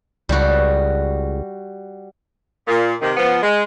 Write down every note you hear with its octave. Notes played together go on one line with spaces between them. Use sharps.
C#2 G3 F#4
A#2
C3 D#3
F3 B3
G#3